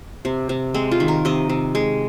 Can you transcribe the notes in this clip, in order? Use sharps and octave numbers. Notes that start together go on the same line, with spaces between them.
C3
C3
G#3 C4
F4
D#3
A#4
C3 D#5
C3
G#3